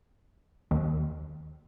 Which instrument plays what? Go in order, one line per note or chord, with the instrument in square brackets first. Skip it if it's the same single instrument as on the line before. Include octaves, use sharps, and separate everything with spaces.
[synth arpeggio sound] D#2